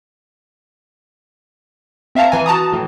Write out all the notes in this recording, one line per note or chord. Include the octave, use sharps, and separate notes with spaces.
C4 E5 F5 A5 A#5
E3 G#5
F#4 A5 A#5 D#6
A2 E3